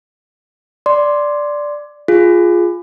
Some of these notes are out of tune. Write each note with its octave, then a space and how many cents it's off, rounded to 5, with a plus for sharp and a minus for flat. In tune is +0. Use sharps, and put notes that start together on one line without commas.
D5 +0 C6 +0
F4 +0 G#4 +0